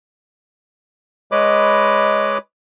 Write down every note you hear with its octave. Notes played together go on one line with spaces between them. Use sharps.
G#3 B4 C#5 D#5 B5 D6